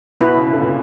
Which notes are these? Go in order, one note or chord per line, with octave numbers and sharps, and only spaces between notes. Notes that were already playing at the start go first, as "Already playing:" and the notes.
B2 B3 E4 B4
C#3
D3
A#2